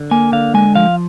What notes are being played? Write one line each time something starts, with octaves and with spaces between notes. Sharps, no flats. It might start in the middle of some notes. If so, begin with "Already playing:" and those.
Already playing: D3
A#3 G#5
D3 F5
G#3 G#5
F3 F5